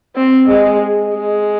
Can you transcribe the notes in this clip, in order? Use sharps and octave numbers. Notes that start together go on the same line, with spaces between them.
C4
G#3
G#3